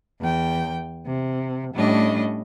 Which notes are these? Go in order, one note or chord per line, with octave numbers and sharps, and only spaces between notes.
E2 G5
C3
A2 G3 C#4 D4 D#5